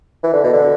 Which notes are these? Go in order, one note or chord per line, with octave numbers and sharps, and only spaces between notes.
E3
D3
B2
D3